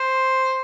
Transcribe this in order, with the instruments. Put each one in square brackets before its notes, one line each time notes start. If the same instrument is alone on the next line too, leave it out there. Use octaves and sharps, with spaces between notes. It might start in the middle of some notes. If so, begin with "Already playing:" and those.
Already playing: [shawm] C5